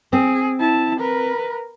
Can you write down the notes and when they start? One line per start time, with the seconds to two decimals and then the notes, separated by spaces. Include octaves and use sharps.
0.13 C4 G#4
0.59 E4 A5
1.00 A#4 B4